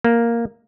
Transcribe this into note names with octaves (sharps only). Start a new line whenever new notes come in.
A#3